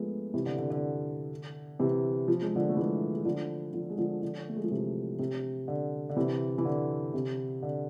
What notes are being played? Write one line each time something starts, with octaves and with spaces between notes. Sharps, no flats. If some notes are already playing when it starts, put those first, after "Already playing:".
Already playing: F3 G#3 A3 B3
C3 E3
D3
D3
D3
C3 E3
F3
G#3
D3 F3
A3
E3 G#3
G#3
D3 F3
D3 F3
G#3
D3 F3
D3 F3
A3
G#3
F3
C3 E3
C3
D3
D3
C3 E3
E3
D3
C3
D3